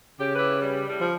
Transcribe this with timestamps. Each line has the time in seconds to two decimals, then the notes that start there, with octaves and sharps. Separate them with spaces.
0.20 C#3 G4
0.36 E4 G4 B4
0.60 G3
0.87 A2 G3
1.00 F3